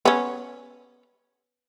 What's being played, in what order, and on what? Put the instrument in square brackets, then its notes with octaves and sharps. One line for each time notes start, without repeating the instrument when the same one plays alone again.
[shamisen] B3 C#4